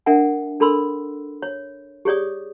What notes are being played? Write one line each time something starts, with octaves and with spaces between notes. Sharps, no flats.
D4 A#4 E5 F#5 G#5
D4 A4 A#4 B5 C6 E6
C#5
G4 G#4 C#5 D5 D#6